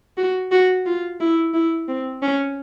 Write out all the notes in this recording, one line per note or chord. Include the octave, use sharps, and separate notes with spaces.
F#4
F#4
F4
E4
E4
C4
C#4